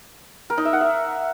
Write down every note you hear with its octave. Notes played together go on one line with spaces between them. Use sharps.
A#4
D#4
E5
F#5
E5